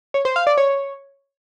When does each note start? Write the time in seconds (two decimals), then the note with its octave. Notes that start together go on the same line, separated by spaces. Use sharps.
0.14 C#5
0.25 C5
0.36 F5
0.47 D5
0.57 C#5